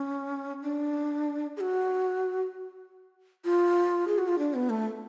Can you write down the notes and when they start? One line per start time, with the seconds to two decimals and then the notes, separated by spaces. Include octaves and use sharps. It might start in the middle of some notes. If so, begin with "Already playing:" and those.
Already playing: C#4
0.63 D4
1.57 G#4
1.60 F#4
3.45 F4
4.08 G#4
4.18 F#4
4.28 F4
4.39 D4
4.54 B3
4.70 A3